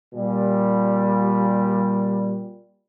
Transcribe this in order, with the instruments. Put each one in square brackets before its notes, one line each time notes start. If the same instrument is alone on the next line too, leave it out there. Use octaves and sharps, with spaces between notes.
[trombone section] A#2 G3